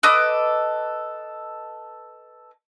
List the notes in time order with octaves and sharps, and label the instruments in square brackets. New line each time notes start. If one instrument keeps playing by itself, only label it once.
[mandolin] A4 B4 D#5 D6